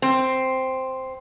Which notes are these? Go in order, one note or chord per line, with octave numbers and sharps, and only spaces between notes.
C4